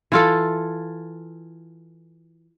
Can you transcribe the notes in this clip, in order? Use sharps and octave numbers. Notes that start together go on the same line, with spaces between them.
E3 F4 A4